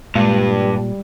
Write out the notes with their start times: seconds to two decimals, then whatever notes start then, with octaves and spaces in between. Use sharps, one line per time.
0.15 G2 A#2 G3 G#3